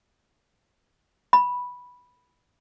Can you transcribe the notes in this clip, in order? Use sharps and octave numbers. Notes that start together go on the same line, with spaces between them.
B5